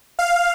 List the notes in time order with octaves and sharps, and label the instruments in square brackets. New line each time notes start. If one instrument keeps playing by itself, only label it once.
[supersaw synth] F5